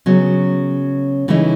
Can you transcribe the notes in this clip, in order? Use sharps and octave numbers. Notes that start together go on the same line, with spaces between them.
C#3 F#3 B3
C#3 E3 A3 D#4